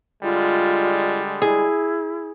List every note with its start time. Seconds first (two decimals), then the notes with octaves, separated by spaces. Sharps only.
0.23 D3 G3 G#3 F4
1.42 E4 G#4